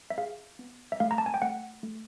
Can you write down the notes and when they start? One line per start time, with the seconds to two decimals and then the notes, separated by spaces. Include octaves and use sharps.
0.10 E5
0.18 G#4 F5
0.59 B3
0.92 E5
1.00 A3 F5
1.11 A#5
1.18 A5
1.26 G#5
1.34 G5
1.42 A3 F#5
1.83 A3